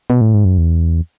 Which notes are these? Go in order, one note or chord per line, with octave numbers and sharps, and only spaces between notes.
B2
A2
G#2
F#2
E2